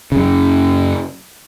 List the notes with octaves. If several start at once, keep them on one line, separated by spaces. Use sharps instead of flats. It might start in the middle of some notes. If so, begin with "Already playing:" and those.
F#2 C#3